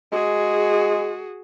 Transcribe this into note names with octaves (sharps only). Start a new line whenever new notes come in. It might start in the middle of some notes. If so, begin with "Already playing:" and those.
G#3 F#4 G#4